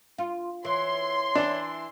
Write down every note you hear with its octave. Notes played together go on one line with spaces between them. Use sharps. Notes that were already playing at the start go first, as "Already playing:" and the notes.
F4
E3 C#5 C6
E3 D4